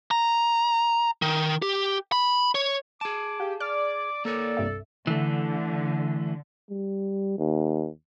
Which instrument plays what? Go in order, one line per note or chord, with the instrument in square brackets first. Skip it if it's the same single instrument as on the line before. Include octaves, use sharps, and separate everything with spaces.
[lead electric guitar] A#5
D#3
G4
B5
C#5
[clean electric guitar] G#4 A5 [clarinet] D6
[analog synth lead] G4 [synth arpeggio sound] F5
[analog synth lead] D5 [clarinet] D6 [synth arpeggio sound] F6
[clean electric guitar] A#3 A#4 C#5 [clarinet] A4
[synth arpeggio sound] C2 G2 E5
[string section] D3 [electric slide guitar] E3 A3
[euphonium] G3
D#2